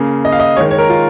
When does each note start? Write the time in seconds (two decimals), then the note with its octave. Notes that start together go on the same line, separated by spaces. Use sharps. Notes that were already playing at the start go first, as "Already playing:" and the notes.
Already playing: C#3 A#3
0.25 D#5
0.32 F5
0.40 D#5
0.57 D#3 G#3 C#5
0.71 C#5
0.78 A#4
0.90 F4